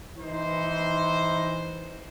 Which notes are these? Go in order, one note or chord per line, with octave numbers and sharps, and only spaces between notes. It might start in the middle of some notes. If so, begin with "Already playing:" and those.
E3 D#4 C5